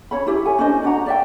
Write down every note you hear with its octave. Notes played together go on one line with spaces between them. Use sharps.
C#4 C#5 B5
E4 G4 E5
A4 C#5 G#5
C#4 D4 C5 D#5
D4 F#4 F#5 A#5
D5 E5 G5